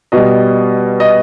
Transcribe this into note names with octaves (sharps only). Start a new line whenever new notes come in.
B2 G3 D#5
D#5